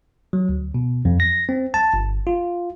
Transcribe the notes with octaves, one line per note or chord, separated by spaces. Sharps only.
F#3
D2
B2
F2
A#6
C4
A5
G1
F4